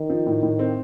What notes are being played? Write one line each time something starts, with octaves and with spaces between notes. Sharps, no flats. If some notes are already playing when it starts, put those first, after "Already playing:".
Already playing: D#3
F3
A2
A2
C4